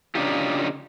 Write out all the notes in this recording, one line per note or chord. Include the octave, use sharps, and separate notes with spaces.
C#3 D4 D#4 F4 G4